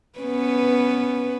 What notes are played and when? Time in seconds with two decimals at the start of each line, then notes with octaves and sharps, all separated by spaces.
0.19 B3 C#4 B4